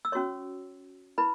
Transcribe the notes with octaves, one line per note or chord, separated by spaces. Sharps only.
E6
C#4 F#4 C#5 C#6
E4 B4 B5